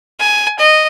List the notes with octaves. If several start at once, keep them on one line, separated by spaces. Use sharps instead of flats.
G#5
D#5